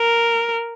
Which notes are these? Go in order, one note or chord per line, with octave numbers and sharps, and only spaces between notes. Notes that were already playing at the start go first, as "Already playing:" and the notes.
Already playing: A#4